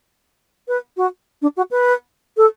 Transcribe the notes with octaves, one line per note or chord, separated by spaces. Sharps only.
B4
F#4
D4
F#4
B4
A4